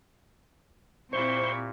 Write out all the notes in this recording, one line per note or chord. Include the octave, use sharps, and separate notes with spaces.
A#2 C4 E4 G4 C5 C#6